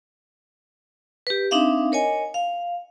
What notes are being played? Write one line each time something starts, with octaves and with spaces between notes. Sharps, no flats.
G4 B4
C4 D4 D#4 E5 F5
A#4 C#5 D#5 G#5
F5